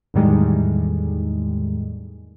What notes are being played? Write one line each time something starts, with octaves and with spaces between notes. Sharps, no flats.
E2 A2 D#3 G3 G#3